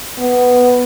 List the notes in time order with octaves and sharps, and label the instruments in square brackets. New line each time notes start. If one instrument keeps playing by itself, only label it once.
[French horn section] B3